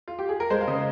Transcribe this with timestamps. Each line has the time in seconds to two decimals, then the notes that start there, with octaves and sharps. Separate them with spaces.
0.08 F4
0.19 G4
0.29 G#4
0.40 A#4
0.50 G#3 C5
0.61 F5
0.67 C#3 D#5